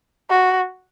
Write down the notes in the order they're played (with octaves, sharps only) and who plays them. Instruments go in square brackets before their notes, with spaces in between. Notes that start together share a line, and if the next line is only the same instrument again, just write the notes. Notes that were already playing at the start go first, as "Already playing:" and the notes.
[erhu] F#4